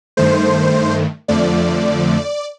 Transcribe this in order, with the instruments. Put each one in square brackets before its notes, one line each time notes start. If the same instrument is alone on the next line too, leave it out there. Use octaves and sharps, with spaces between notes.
[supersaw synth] G2 D#3 A3 C5
F2 D3 F3 A3 D5